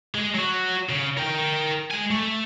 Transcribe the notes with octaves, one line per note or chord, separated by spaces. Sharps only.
G#3
F#3 F#4
C#3
A#4 G5
G#3 G#5
A3